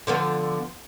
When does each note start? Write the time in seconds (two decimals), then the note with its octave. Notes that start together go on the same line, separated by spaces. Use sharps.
0.07 D3 F3 B3